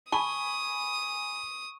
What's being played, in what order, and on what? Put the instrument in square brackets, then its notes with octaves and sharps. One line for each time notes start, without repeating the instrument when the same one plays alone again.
[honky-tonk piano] G#5 B5 [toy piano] A5 [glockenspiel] C#6 [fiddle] D#6